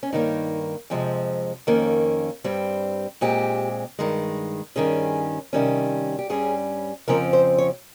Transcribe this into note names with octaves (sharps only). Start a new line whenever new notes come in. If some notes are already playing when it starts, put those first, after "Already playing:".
C#4
G2 D#3 A#3 D#4
F2 C3 F3 G#3
F2 D#3 A#3 C#4
G2 G3 C4
A#2 G#3 C4 G4
G2 D#3 G#3
G2 D#3 G3 C#4 G#4
C3 D#3 G3 C#4
G4
G2 G3 C#4 G#4
F2 C#3 F3 C4 A#4
C5
C#5